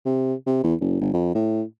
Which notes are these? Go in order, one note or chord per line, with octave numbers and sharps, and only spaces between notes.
C3
C3
E2
F#1
G1
F2
A2